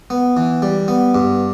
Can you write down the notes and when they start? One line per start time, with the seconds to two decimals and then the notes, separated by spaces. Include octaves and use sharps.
0.10 B3
0.37 E3
0.62 G3
0.88 B3
1.15 G2